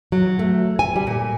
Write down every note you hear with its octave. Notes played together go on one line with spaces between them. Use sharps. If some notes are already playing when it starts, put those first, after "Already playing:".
F#3
A3
G#5
G3
A#2